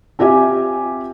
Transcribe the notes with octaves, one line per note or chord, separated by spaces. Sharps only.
C4 F4 G4 E5 G#5